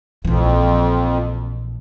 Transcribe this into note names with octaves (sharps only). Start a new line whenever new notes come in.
A#1 F2 E3